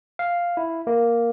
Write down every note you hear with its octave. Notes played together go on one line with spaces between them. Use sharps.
F5
E4
A#3